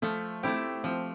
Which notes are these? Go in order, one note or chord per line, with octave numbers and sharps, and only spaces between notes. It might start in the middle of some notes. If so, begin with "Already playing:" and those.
F3 A3
A3 C4 E4 G4
F3 C4